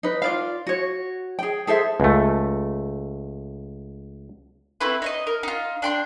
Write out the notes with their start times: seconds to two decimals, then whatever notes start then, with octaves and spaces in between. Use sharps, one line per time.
0.03 D#4 B4
0.22 F4 D5 F5
0.67 F#4 C#5
1.39 G#4 G5
1.67 G#4 A4 C5 E5
2.00 C#2 A3
4.81 A3 C4 E4 B4
5.02 D#4 C#5 D#5
5.27 A#4
5.43 D#4 F4
5.82 D4 G5 C6